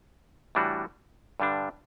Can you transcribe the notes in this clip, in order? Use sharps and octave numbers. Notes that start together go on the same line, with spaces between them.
A2 E3 G3 D4 F#4
G2 D3 G3 D4